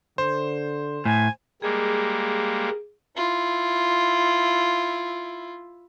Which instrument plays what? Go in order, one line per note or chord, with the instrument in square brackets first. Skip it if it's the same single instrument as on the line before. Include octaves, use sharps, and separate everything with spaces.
[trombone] D3 [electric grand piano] C5
[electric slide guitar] A2 [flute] G#5
[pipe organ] G3 G#3 A#3 [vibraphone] G#4
[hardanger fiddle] E4 F4